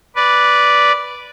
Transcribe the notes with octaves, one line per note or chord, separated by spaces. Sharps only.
B4 D5